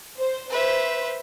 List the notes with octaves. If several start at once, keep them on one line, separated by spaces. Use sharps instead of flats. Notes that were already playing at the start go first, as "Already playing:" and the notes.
C5
B4 C5 E5